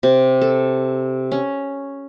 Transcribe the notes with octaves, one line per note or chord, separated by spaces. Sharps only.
C3
A4
C#4